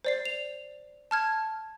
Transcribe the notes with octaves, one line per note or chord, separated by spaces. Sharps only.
C5 D5 C7
F7
A5 F6 G#6